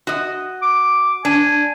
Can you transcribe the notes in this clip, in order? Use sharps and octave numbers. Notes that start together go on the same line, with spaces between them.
F#4 D#5
D6
D4 G#5